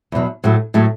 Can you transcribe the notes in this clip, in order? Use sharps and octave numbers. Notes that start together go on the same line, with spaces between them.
E2 B2 F#3
A2 F#3 A3
A2 F#3 A3